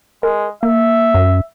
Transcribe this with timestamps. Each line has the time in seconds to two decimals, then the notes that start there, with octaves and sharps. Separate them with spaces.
0.23 G#3 A#4
0.63 A#3 E5
1.14 F#2